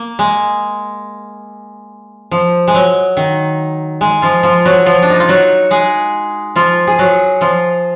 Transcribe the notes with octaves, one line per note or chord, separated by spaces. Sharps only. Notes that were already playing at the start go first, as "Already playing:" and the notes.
Already playing: A#3
G#3
F3
G#3
F#3
D#3
G#3
F3 F4
F3 F4
F#3 F#4
F3 F4
D4
D#4
F4
F#3 F#4
G#3 G#4
F3 F4
G#4
F#3 F#4
F3 F4